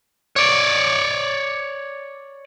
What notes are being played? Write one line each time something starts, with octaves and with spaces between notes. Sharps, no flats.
C#5 D5